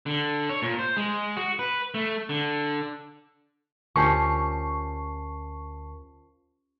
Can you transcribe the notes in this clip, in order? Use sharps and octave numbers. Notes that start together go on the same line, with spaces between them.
D3
C#5
A#2
C5
G#3
F#4
B4
A3
D3
D2 F3 C#4 G4 A#4 A5 C#6 C7